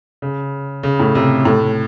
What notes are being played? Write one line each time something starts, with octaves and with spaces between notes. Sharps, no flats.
C#3
C#3
A2
C3
A2